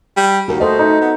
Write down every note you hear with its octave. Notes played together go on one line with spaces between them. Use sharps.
G3
D#2 F#4 A#4
A3 A4 C5 D#5
D#4
B3